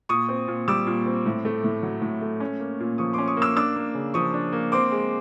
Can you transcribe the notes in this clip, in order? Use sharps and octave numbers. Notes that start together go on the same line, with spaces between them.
A#2 C#6 D#6
C4
A#2
G3 D6 E6
A#2
C4
A2
A3
A2
F#3
A2
A3
C#4
A#3
A#2
F3 C#6 D#6
C6 D6
C#4
C#6 D#6
A#3
D6 E6
D4 D6 E6
A#3
C#3
F3 C#6 D#6
D4
A#3
C4 C6 D6
G#3